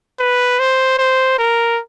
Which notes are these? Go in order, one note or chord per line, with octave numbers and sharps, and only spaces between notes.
B4
C5
C5
A#4